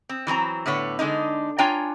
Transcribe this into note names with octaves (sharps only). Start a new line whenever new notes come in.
C4
E3 F#3 C4 A#5
A2 D3 B3 C#5
D3 G#3 D4 D#4
D4 F4 C#5 G5 G#5 A#5